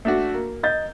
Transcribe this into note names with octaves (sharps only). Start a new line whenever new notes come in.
A3 D4 F#4
A#3
D#5 G6 A6